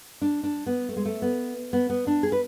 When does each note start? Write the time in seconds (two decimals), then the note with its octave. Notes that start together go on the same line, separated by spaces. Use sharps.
0.21 D4
0.43 D4
0.67 B3
0.89 A3
0.96 G#3
1.05 A3
1.22 B3
1.73 B3
1.90 B3
2.07 D4
2.23 G#4
2.32 B4